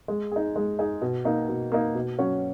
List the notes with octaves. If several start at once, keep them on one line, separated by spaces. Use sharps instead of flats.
G#3
D#4 G#4
G#3
D#4 G#4
B2
A#3 D#4
B2
A#3 D#4
B2
F#3 C#4 F#4 C#5